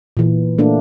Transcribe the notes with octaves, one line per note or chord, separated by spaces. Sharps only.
A#2 E3
A3 A#3 D4